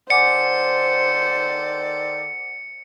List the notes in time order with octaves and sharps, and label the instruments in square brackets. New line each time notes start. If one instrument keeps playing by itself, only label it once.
[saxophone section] D#3 A4 D5 [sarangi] C5 [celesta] F#5 G#5 D6 [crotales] C#7